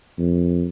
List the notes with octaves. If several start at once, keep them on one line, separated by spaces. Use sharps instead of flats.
F2